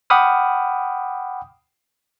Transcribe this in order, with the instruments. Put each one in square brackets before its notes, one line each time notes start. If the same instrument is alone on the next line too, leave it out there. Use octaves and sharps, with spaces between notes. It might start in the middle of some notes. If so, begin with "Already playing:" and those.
[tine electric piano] F#5 G5 B5 D6 D#6 F6